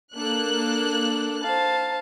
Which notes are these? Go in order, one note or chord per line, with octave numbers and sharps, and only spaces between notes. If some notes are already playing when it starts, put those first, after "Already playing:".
A#3 D4 A4 F#6
C5 F5 A5